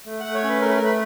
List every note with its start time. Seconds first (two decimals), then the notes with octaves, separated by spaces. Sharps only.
0.06 A3
0.20 A3 F#5
0.34 C#5
0.44 C#4 B4
0.62 A3 A#4
0.69 B4
0.76 A#4
0.81 A3 B4